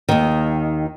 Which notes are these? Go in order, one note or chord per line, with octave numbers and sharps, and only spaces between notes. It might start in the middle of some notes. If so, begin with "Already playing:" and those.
D#2 D#3